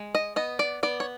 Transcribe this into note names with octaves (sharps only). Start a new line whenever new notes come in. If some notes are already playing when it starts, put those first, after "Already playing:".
Already playing: G#3
D#5
B3 D#5
D5
B3 D5
C#5